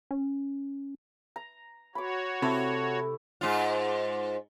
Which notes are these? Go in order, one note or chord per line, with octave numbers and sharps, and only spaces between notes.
C#4
A#5
F#4 C#5 B5 D6
C3 A3 E4 A4
G#2 F4